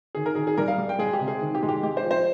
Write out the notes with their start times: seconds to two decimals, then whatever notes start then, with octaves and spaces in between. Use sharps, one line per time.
0.15 D#3 G#4
0.26 A#4
0.35 D#3 G#4
0.47 G#4
0.57 G3 A#4
0.68 F5
0.78 G3
0.89 G5
0.99 G#3 G#4
1.13 G4
1.20 C3
1.28 G#4
1.41 D#3
1.55 G4
1.62 G#3
1.69 G4
1.83 G#3 G4
1.97 C5
2.04 F3
2.11 C5